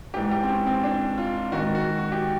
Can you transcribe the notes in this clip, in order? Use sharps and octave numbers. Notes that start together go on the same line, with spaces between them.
G#2 E3 G4
G4
C4
C#4
C4
D4
F4
G#2 D#3 F#4
F#4
F#4
G4